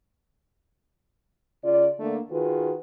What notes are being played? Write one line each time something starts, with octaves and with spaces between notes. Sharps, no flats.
C#3 F4 D5
D3 A3 A#3 D4
D#3 F4 F#4 G#4 B4